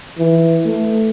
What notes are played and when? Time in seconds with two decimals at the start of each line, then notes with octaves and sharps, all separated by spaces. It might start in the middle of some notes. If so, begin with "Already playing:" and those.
0.18 E3
0.66 A3